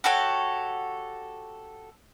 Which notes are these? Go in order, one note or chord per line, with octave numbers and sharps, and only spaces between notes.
F#4 G4 A4 C#5